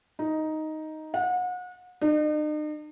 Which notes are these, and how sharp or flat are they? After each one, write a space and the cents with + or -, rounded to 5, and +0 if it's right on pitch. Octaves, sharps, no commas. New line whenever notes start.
D#4 +5
F#5 -35
D#4 -45